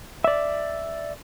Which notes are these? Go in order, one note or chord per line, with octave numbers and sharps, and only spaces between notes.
D5 E5